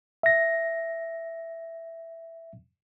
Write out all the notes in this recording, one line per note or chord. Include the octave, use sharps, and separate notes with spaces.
E5 A#6